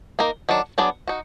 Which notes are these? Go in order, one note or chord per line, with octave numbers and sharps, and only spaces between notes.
A#3 D#4 A#4
D#3 F#3 D4
F#3 B3 D4 G#4 D5
D#4 F#4